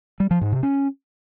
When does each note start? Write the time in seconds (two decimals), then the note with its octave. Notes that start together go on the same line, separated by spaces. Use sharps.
0.20 G3
0.31 F3
0.41 G#2
0.52 C3
0.63 C#4